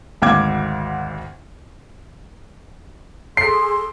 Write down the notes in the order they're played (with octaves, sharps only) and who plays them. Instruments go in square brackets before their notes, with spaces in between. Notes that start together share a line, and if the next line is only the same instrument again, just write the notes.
[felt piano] G#1 D2 F5 F#5 D6 G#6
[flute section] G#4 A4 C6 [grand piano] C7